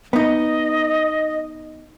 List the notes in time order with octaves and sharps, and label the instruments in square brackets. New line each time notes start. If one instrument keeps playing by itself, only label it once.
[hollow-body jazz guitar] B3 D#4 [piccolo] D#5